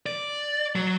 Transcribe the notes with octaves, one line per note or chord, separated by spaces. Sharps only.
D5
F#3